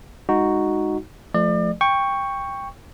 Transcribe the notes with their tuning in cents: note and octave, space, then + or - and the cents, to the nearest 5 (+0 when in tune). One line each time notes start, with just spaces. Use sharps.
G#3 -10 D#4 +0 F#4 +0
F3 +0 A3 -15 D5 +35
G5 +15 C#6 +0